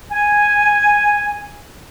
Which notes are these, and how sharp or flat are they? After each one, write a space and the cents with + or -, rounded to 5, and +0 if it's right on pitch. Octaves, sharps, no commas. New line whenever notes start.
G#5 -5